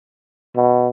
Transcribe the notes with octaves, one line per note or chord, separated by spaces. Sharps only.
B2